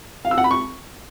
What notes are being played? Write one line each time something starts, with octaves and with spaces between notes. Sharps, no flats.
F5
E6
F#5
B5
C#6